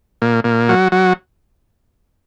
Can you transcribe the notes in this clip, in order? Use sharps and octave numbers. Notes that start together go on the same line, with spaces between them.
A#2
A#2
F#3
F#3